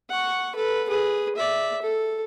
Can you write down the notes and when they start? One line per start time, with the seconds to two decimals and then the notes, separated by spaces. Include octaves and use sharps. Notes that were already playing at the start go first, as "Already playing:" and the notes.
0.10 F#5 C#6
0.56 A4 B4
0.89 G#4 B4
1.36 D5 E5
1.82 A4